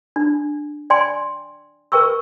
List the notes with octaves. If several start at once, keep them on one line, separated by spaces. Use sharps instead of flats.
D4
D5 G5 G#5 C6
A#4 B4 G5 C#6 E6